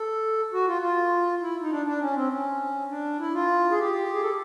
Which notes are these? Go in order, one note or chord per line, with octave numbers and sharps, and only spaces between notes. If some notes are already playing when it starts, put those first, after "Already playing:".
Already playing: A4
F#4
F4
F4
E4
D#4
D4
D4
C#4
C4
C#4
D4
E4
F4
G#4
G4
G#4
A4